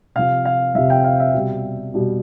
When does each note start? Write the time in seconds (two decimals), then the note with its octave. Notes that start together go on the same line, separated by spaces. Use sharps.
0.15 C3 F3 F5
0.45 F5
0.75 C3 F3 E5
0.90 G5
1.04 F5
1.20 E5
1.34 B2 G3
1.94 B2 G3